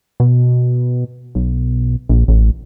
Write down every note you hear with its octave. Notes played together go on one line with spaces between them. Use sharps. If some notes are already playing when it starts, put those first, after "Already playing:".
B2
B1
A#1
A1